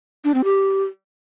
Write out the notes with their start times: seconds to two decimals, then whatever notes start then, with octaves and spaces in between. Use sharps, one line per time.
0.25 D4
0.34 C4
0.44 G4